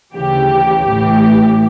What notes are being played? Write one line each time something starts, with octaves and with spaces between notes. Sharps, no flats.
D2 C#3 E3 G4
A1 A2 E3 G4